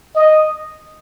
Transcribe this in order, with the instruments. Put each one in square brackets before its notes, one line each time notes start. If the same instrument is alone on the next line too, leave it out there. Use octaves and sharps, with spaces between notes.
[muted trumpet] D#5